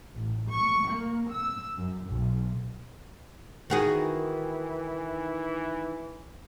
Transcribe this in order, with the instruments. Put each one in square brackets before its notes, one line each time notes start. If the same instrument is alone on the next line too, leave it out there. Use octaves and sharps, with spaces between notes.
[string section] A1
C#6
A#3
E6
F#2
B1
[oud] D#3 F#4 G#4 [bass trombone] E3